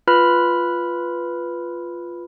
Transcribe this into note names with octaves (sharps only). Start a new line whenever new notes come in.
F4 B4 B5 F6